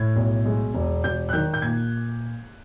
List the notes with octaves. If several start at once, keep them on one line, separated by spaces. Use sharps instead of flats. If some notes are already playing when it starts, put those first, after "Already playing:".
Already playing: A2 G#6
B1
G#3
E1
E1 G6
F#6
D#3 G6
G6
A#2 G#6